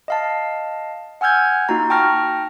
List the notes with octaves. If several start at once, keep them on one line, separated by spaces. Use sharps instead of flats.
D#5 F5 A5
F#5 G#5 E6 F6 G6 G#6
A#3 D#4 F4 F#4 A#5
G5 A5 C#6 F6 A#6